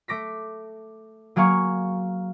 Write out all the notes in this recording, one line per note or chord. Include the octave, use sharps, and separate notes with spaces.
A3 D6 A#6 B6
F#3 A#3 G#4 F5 C#6